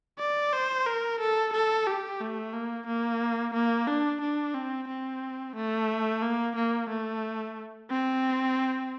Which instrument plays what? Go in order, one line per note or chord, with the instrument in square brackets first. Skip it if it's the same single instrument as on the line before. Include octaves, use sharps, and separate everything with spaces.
[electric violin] D5
C5
A#4
A4
A4
G4
A3
A#3
A#3
A#3
D4
D4
C4
C4
A3
A#3
A#3
A3
C4